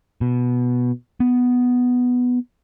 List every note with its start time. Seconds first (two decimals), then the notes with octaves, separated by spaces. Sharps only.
0.21 B2
1.20 B3